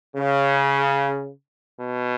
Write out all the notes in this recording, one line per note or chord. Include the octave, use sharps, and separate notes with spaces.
C#3
B2